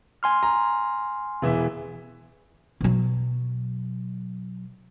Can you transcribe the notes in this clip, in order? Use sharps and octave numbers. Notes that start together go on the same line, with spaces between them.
G#5 C6 F6
A#5
E1 E3 E5
B2 F#3